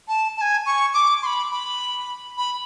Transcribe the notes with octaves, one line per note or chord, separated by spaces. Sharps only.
A5
A5
G#5
C#6
D6
C6
B5
B5
B5